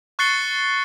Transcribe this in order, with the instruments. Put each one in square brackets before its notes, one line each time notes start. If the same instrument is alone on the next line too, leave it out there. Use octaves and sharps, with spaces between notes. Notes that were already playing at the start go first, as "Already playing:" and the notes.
[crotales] C#6 F#6 A6 C7 C#7 G7